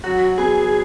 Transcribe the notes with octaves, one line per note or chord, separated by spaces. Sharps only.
F#3 F#4
B3 G#4